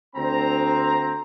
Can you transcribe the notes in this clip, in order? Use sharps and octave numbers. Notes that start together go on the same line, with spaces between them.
D2 C4 A#5